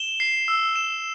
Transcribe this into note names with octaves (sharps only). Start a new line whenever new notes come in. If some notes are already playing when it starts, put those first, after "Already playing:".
Already playing: E7 G7
C7
E6
E7